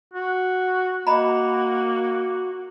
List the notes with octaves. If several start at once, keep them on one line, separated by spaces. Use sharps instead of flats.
F#4
A#3 F#4 D#5 A#5 B5